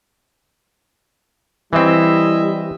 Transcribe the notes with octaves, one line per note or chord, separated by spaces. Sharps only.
E3 G3 C4 E4 D#5 E5